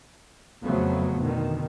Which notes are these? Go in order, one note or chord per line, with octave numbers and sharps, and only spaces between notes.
F2 C#3 F3 F#3 A3 B3
B2 D3 D#3